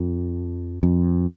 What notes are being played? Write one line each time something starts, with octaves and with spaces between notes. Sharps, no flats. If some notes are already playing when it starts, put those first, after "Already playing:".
Already playing: F2
F2